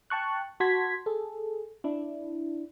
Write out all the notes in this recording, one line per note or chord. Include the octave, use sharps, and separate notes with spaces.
G5 A5 C#6 F#6
F#4 A5 C6 G#6 B6
G#4 A4
D4 E4